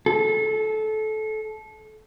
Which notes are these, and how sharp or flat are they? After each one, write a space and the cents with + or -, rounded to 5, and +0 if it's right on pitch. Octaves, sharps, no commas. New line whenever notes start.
A4 -20